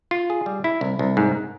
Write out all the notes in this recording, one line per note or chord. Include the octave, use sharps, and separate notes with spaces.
F4
G#4
G3
E4
C2
C2
G#2